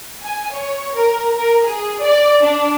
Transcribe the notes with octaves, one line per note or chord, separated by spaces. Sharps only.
G#5
C#5
A#4
A#4
G#4
D5
D4